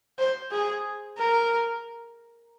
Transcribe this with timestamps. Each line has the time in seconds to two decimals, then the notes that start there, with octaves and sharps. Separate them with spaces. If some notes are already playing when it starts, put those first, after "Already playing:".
0.18 C5
0.51 G#4
1.17 A#4